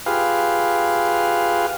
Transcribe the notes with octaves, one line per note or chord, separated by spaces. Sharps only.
F4 G4 G#4 B4 F5